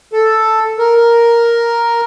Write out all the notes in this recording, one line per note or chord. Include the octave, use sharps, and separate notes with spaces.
A4
A#4